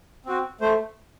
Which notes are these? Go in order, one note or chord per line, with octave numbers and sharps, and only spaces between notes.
C4 F#4
A3 C5